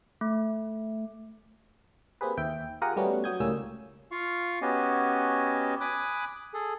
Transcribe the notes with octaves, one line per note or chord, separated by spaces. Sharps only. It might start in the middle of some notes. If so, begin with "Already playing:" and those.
A3
A#3 C4 G4 G#4 B4
D#2 E5 G5
F4 G4 G#4 A#4 F#5 D#6
G3 A3 B3 C#4 F#4
F#3 F#4 D#6 G6 G#6
C#2 A2 G3 A#3 C#4 E6
F4 F5 C#6
B3 C#4 F#4 G4 D#5 G#5
G#5 B5 D6 D#6 F#6
G#4 A4